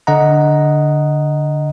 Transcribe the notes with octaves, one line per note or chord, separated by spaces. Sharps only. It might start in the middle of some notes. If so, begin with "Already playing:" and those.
D3 D#5 F#5 A#5